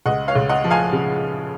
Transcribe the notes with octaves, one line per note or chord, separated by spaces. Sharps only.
C#2 D#5 F#5
C#5 F5
C#2
D#5 F#5
F3
F5 G#5
C#3